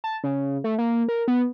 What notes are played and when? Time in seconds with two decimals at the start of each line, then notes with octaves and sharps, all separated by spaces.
0.04 A5
0.24 C#3
0.64 A3
0.78 A#3
1.08 A#4
1.28 B3